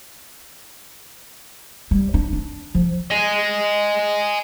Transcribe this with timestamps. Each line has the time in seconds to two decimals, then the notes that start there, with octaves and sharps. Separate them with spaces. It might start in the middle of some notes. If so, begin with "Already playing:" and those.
1.91 G3
2.14 D4
2.33 D4
2.75 F3
3.11 D#5 G#5